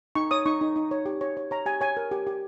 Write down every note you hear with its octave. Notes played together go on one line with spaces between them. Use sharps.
D#4 C#6
C#5 D#6
D#4 C#6
D#4
D#4
C#5
G4
C#5
C#5
C#5 A#5
G4 G#5
C#5 G#5
A#4
G4
G4